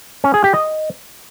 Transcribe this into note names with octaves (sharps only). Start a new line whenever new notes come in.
C#4
G#4
G4
D#5